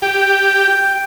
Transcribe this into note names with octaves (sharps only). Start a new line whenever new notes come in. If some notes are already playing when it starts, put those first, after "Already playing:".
G4 G5